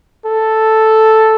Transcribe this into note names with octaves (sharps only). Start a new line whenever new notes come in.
A4